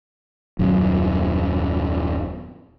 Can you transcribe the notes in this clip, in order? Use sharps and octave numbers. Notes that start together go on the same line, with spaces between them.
D#1 F#2